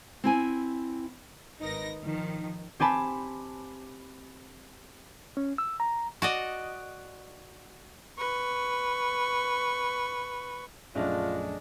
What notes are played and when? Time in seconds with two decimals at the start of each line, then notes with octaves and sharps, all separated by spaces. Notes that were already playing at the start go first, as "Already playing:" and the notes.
0.24 C4 E4 G#5
1.60 G#1 D#4 A#4 B4 A#6
2.03 D#3 F3
2.80 C4 G4 G#5 A5 B5
5.37 C#4
5.58 E6
5.80 A#5
6.22 F#4 D5 D#5
8.18 B4 C#6
10.95 A#1 F#2 A3 C#4 D4 F4 G#4 D#5